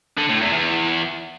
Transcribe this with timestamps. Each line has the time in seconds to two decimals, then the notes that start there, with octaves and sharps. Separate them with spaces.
0.17 D3
0.29 A2
0.41 E2
0.52 E2